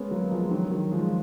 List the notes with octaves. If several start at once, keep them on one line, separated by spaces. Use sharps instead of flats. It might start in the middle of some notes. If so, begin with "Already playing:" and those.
Already playing: G#3 A#3 B3 C#4
F#3 A#3
F3 G#3
D#3 F#3
D#3 F#3
F3 G#3